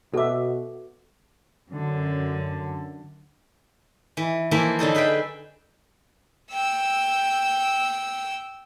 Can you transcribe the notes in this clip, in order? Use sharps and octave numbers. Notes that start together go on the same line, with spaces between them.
B2 F#4 A4 E5 D6
F#2 D3
E3
E3 F3 A#3 E4
D3 F#3 D#4 A4
G#4 B4 E5 G5
G5 E6